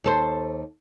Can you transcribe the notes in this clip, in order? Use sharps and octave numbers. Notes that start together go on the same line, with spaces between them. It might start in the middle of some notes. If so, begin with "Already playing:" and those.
D#2 A4 C5